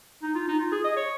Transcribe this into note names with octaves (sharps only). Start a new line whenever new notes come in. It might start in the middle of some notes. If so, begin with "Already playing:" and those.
D#4
F4
D#4
F4
G#4
D#5
C#5